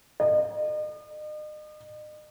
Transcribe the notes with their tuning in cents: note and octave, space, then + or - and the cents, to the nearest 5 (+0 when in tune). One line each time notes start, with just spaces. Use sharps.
D#5 -40